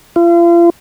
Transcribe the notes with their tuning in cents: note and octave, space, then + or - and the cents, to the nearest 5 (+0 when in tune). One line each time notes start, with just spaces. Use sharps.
F4 -40